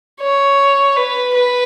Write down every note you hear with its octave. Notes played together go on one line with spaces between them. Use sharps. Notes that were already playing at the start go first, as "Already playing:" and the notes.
C#5
B4
B4